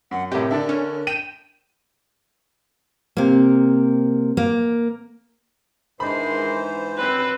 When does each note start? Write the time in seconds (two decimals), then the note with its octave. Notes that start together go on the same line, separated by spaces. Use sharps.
0.11 F#2 F#5
0.32 A2 C3 G4 A#4
0.51 D3 D4 A4 E5
0.69 C#4
1.07 G5 D#7 E7
3.17 C3 A#3
4.37 A#3
6.00 G#2 D#3 E3 G#3 D4 C5 B5 C6
6.98 F#2 C4 B4